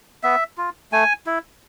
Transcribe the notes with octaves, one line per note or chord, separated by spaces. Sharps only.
B3 E5
F4
A3 G#5
E4